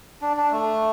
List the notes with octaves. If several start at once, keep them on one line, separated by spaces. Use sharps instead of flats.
D4
D4
A3